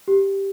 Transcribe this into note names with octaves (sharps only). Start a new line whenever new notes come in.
G4